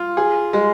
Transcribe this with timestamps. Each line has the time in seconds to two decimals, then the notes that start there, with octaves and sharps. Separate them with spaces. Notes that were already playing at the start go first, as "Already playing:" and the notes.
Already playing: F4
0.17 G#4
0.53 G#3